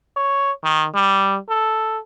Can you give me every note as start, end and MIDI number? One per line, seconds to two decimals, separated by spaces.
0.17 0.52 73
0.64 0.86 51
0.95 1.38 55
1.49 1.99 69